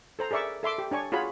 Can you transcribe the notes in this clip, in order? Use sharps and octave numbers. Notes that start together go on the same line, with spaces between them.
A4 C5 A#5
G#4 A#4 D5 E5 C#6
A4 E5 C6 D6
G4
D4 C#5 G#5 C#6
F4 F#4 G#4 C#5 B5